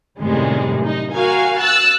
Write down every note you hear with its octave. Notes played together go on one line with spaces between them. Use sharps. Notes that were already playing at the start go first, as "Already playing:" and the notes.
F#2 A2 C3 D#3 G3 G#3
D#4
F#4 A#4 F5 G#5
E6 F#6 A6